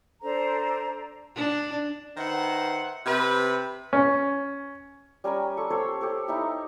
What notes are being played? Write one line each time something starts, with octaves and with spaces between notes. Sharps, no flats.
D4 A4 C5 A#5
D4
D#3 B4 C5 E5 F#5
C3 C4 B4 E5 B5
C#4
G3 C#4 A#4 G#5
G4 A4 C#6
G4 A4 C5 C#5
G4 A4 C#5
D#4 E4 G4